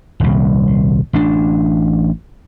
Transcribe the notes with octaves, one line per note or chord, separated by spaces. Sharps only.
D#1 C2
A1 D4